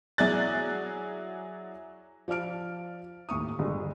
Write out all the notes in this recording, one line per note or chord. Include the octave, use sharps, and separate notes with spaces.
F#3 E4 G#4 D5 F#6 A6
F3 D5 A5 F6 D7
D#2 A2 C#6 D#6
G1 G#3